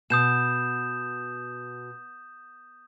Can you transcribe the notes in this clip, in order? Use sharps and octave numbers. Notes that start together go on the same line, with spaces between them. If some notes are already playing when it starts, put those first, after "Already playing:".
B2 D#6 G6 E7